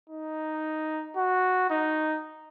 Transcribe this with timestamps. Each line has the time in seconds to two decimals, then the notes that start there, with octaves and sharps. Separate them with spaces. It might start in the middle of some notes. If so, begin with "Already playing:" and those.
0.09 D#4
1.17 F#4
1.70 D#4